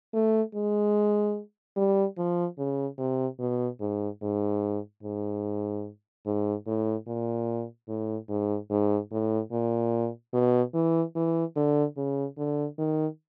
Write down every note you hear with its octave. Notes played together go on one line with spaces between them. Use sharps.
A3
G#3
G3
F3
C#3
C3
B2
G#2
G#2
G#2
G#2
A2
A#2
A2
G#2
G#2
A2
A#2
B2
E3
E3
D3
C#3
D3
D#3